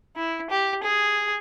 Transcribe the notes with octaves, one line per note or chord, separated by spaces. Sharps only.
E4
G4
G#4